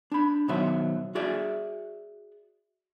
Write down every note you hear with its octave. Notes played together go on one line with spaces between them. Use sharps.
D4 B5
B2 D#3 F#3 C5 E5
F#4 G#4 D5 E5